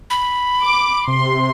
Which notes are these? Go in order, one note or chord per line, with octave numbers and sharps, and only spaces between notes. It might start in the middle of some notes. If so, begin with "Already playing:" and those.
B5
D6
C3 C6